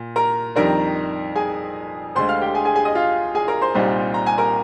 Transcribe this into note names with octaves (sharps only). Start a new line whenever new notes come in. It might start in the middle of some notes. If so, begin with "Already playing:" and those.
Already playing: A#2
A#4 A#5
F2 D#3 G3 D4 A#4 A#5
G#4 G#5
D2 D3 G#3 C5 C6
F5 F6
G4 G5
G#4 G#5
G#4 G#5
G#4 G#5
D#5 D#6
F4 F5
G#4 G#5
A#4 A#5
C5 C6
C2 A#2 G3 C4 D#4
A#5
G#5
A#4 A#5